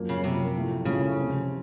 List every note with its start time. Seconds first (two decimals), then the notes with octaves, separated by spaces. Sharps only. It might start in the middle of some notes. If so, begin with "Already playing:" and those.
Already playing: F#2 F3 A#3
0.09 C#3
0.24 F#2 C3 F3 A#3
0.56 A2 F3 A3
0.85 A2 C#3 F3 A3
1.16 C3 F3 C4 F4